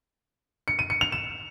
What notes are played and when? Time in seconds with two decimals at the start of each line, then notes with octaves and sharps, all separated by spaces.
0.68 C#7
0.79 D#7
0.90 C#7
1.01 F7
1.12 E7